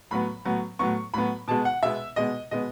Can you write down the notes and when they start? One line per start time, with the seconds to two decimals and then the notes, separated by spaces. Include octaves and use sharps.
0.11 A2 F#3 B3 B5
0.45 A2 F#3 B3
0.79 A2 F#3 B3 C#6
1.14 A2 F#3 B3 B5
1.48 B2 G#3 B3 A5
1.65 F#5
1.82 B2 G#3 B3 E5
2.16 B2 G#3 B3 D#5
2.51 B2 G#3 B3 D#5